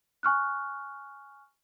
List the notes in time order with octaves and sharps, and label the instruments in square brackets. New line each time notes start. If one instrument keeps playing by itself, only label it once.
[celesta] G#5 C#6 F6 F#6